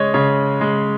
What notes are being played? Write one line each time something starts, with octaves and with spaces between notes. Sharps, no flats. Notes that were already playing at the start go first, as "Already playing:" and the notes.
Already playing: C#3 G#3 C#5 D#5
C#3 C#5
G#3